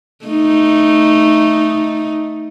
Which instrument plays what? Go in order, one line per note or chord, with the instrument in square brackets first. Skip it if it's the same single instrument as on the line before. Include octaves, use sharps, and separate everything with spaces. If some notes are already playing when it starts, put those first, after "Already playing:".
[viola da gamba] A3 D#4